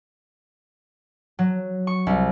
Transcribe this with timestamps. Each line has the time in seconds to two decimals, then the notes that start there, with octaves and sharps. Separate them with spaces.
1.39 F#3
1.87 C#6
2.07 C2